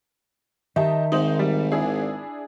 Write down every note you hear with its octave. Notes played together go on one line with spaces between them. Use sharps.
D#3 G4 D#5 E5 A5
G#1 D#4 C5 F#7
G3
D4 E4 G#4